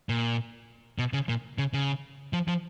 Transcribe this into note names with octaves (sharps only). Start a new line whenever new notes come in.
A#2
B2
C#3
A#2
C#3
C#3
F3
F3